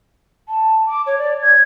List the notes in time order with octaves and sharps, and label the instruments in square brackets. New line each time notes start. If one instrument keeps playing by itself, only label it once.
[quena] A5
D6
C#5
D5
G#6